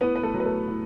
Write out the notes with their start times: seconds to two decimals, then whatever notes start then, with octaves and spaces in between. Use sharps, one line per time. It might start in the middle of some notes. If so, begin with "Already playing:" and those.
0.01 A2 B3 B4
0.16 B4
0.23 A3 A4
0.34 F#3
0.40 B4
0.45 A3 A4
0.68 A2